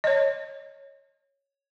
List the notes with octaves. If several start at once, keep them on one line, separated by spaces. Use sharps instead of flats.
C#5 D#5